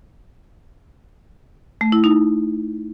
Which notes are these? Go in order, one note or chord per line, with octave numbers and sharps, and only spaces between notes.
A3
E4
D#4